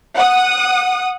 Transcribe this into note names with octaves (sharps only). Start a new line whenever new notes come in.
F#5 D#6